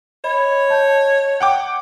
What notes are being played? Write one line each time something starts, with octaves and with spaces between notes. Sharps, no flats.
C#5 D#5 B5 G#6
D#5 A5 G6
F#5 G5 D6